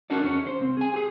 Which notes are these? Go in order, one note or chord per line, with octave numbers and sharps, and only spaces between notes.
C#4 D4 F#4 A4 A#4 D5
E2 C#4 C#5
C5
C2 C4
G#4 G#5
G4 G#4